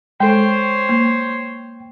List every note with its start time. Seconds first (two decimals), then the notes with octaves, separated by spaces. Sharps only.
0.20 G#3 A4 C5 C#5 G5
0.89 A#3